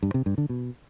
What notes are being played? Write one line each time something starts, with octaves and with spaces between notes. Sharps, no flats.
G2
C3
G2
D3
B2